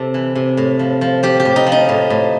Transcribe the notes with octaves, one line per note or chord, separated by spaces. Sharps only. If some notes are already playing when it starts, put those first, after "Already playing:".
Already playing: C3 A4
E3
C3
A2
F3
F3
F3 G4
G4
A2
D#4
F3
D#4
A2
A2